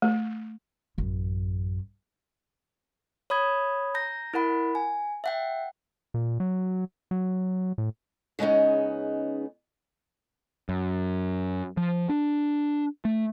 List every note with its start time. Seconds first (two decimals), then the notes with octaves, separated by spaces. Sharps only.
0.02 A3
0.98 A1 F#2
3.30 C#5 B5 D#6 G#6
3.94 A#5 G6 A#6
4.34 E4 A#4 F#5 B5
4.75 G#5
5.24 E5 F#5 G5
6.14 A#2
6.40 F#3
7.11 F#3
7.78 A2
8.39 C#3 G#3 B3 C#4 D#4
10.69 F#2
11.77 F3
12.09 D4
13.05 A3